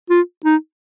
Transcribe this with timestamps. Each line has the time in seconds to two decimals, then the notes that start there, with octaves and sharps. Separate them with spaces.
0.10 F4
0.45 D#4